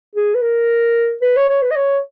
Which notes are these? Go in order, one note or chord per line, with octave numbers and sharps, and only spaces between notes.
G#4
B4
A#4
B4
C#5
C#5
B4
D#5
C#5